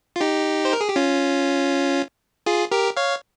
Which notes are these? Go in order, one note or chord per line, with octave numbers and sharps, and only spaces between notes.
F4
D#4 G4
C5
A#4
G#4
G4
C#4 F4
F4 G#4
G4 A#4
C#5 F5